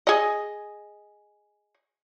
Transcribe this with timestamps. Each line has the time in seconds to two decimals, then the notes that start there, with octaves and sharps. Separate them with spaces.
0.07 G#4 D#5